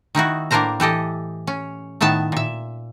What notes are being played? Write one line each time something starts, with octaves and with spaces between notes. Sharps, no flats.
D#3 D#4 E4 F#4
A2 A#3 D4 A#4 C5 A#5
E3 G4 A4 D#5
C#4
A2 D#3 B3 E5 A5
A#2 E5